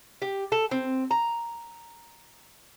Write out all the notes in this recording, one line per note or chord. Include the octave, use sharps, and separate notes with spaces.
G4
A4
C4
A#5